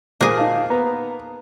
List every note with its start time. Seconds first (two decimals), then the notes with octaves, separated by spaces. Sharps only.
0.21 A#2 A#3 G#4 C5
0.37 D#4 F5 A5
0.70 B3 A#5